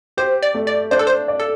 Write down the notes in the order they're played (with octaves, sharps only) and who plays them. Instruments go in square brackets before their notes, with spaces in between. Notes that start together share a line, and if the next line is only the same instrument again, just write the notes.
[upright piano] G4 [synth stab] C5
[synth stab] D5
[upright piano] A3
[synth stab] D5
[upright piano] D4 [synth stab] C5
[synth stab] A4
C5
[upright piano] D5
[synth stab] A4